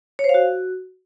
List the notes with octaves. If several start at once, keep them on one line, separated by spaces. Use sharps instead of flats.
C#5
C5
F5
F#4